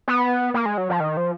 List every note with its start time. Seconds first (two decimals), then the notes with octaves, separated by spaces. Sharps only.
0.08 B3
0.54 A#3
0.66 G#3
0.78 F#3
0.90 F3
1.00 D#3
1.17 F3